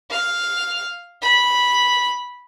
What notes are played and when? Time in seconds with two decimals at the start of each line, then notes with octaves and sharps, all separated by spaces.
0.11 F5
1.22 B5